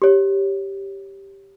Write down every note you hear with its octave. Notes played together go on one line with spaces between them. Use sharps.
G4 C#5